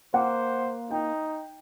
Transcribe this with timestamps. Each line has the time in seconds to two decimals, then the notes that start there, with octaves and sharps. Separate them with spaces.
0.14 A#3 C5 F#5
0.91 D#4 G5